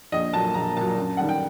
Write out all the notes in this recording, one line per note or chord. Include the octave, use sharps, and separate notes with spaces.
A#1 D#5
A#2 F#3 A5
A#1 A#5
A#2 F#3 A5
F#2
D#3 G3 F#5
G5